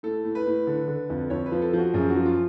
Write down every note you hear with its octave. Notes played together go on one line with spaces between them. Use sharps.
A2 A4
A2
B4
A2
D3
D3
F2
F2 C#5
B4
F3
A4
F3 F#4
F#2 G#4
F#4
F3
F4